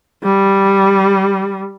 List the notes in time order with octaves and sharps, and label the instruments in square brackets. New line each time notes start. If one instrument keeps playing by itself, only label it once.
[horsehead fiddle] G3